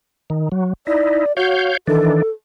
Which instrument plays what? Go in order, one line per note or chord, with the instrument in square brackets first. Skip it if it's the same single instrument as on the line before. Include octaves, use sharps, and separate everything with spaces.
[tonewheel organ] D#3
F#3
[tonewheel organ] D#4 E4 [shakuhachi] D5
[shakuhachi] F#4 [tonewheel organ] C#5 F5 G6
[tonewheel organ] D#3 E3 D4 [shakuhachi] A4